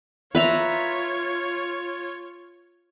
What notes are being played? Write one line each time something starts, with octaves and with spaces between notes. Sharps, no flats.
F4 B4 C#5 E5 A#5